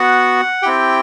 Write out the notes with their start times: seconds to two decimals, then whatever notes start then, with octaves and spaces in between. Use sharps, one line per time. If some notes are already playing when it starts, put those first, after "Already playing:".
Already playing: B3 F#4 F#5
0.62 C4 E4 G4 G5